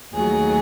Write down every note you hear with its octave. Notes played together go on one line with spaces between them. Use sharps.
D#2 D#3 F#3 A3 G#4